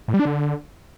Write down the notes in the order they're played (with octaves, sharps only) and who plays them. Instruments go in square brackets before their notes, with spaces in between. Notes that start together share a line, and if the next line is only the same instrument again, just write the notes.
[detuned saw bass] A2
G3
D4
D3